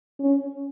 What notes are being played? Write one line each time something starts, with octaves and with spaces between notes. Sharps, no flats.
C#4